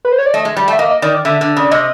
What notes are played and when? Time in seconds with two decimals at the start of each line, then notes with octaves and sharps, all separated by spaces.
0.05 B4
0.12 C5
0.18 C#5
0.26 D5
0.34 A3 D#5
0.45 G#3
0.57 G3
0.68 A3 E5
0.79 A#3 D#5
0.90 D#5
1.02 D#3 D5
1.14 D5
1.25 D3 E5
1.41 D3
1.57 C#3 D5
1.71 C3 D#5